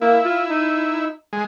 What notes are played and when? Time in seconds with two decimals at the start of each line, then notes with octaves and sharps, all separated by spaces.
0.01 A#3 E4
0.25 F4
0.49 D#4
1.33 G#3